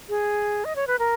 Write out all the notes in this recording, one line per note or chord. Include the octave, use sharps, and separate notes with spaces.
G#4
D#5
C#5
B4
A#4